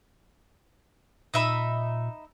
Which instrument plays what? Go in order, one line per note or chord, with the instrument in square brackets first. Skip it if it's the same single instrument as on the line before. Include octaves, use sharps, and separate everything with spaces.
[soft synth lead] A#2 [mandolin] D#4 E5 B5